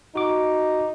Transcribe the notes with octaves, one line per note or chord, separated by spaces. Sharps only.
D#4 F#4 D6